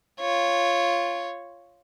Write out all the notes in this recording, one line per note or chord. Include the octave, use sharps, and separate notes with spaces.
F4 C#5